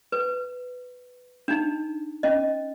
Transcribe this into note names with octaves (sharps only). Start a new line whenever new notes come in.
B4
D4 D#4
C#4 D#5